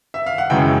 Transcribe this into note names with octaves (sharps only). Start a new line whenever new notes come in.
E5
F5
F#5
F#2 C#3 E3 G#3 G5